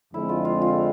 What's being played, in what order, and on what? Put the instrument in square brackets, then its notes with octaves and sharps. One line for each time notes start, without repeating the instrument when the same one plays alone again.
[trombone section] F2 D3 F3 G#3 C4 [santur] E4
[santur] F4
F4
F4